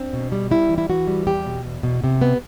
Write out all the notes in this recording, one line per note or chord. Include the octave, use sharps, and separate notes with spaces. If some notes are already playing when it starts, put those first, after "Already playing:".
Already playing: C4 D4
B2
G3
G3 E4
E3
E4
E3 F#4
G3
E2 G4
B2
E2
B2
C3
B3